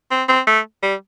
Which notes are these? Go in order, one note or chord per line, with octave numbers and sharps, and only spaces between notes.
C4
C4
A3
G3